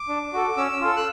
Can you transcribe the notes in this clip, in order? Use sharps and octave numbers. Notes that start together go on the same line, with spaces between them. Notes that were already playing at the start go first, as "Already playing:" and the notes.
Already playing: D6
D4
F#4 A4
C#4 E6
F4 A4
F#6